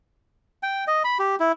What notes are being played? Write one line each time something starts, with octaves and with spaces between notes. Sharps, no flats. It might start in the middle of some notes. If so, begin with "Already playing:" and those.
G5
D#5
B5
G4
E4